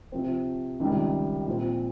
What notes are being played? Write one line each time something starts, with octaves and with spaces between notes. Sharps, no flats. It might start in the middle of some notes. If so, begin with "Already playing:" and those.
C3 F3 C4
C#2 C3 D#3 G3
A#2 F3 C4